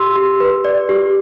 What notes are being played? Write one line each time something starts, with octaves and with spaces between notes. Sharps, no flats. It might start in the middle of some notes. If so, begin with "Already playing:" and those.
Already playing: G4 C6 E6
G4
B4
D5
G4